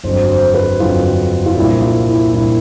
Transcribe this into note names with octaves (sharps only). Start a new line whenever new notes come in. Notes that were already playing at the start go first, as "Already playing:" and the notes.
G1 F2 D3 F#3 C5
C5
B4
G1 F2 D3 F#3 F4
F4
C2 A#2 F3 A#3 D4 E4
F4
E4
C2 A#2 F3 A#3 D4 E4